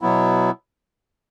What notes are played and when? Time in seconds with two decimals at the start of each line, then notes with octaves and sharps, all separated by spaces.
0.02 B2 F#3 B3 E4